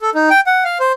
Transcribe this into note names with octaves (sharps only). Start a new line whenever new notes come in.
A4
D#4
G5
F#5
F5
C5